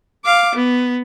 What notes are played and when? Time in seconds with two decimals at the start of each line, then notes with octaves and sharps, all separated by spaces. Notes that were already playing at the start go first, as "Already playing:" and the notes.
0.25 F5 D6
0.55 B3